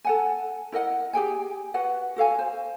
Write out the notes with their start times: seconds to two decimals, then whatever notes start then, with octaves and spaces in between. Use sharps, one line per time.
0.04 A4 F#5 G#5
0.72 E4 A#4 D#5 F#5
1.13 G4 G#4 G5 G#5
1.74 F#4 B4 F#5
2.16 F#4 A4 F5 G#5
2.39 C5